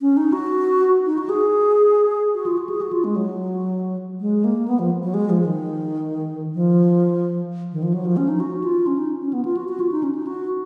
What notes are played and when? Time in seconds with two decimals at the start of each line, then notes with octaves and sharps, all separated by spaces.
0.01 C#4
0.17 D#4
0.33 F#4
1.06 D#4
1.18 F#4
1.29 G#4
2.35 F#4
2.46 F4
2.57 F#4
2.69 G#4
2.81 F#4
2.92 F4
3.04 G#3
3.16 F#3
4.20 G#3
4.44 A#3
4.68 B3
4.79 F3
5.03 F#3
5.14 G#3
5.30 F3
5.45 D#3
6.54 F3
7.72 D#3
7.83 F3
7.94 F#3
8.05 F3
8.17 C#4
8.28 D#4
8.40 F#4
8.64 F4
8.87 C#4
8.98 D#4
9.22 C#4
9.33 B3
9.45 F4
9.57 F#4
9.68 F#4
9.80 F4
9.92 D#4
10.03 C#4
10.15 D#4
10.27 F#4